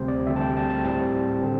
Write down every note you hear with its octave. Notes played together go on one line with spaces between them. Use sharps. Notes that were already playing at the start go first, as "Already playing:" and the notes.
Already playing: D2 C3 G3 C4 C5
D5
D2 D3 G3 C4 E5
A5
G5
A5
A5
A2 G3 C4 A5
D3 C4